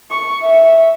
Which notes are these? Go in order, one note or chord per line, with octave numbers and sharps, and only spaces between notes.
C#6
E5